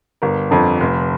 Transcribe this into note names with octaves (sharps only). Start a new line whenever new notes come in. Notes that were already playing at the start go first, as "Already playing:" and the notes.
G1 A#4
F2 D3
F1